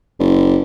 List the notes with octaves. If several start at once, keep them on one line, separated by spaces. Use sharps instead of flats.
F#1